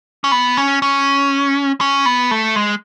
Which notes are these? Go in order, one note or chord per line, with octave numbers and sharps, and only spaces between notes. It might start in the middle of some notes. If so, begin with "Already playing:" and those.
C#4
B3
C#4
C#4
C#4
B3
A3
G#3